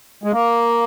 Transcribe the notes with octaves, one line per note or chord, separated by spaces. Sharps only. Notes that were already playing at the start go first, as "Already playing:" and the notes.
G#3
A#3